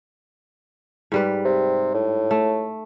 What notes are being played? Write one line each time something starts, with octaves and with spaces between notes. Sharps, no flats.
G#2 G3 B4
C3
A2
A3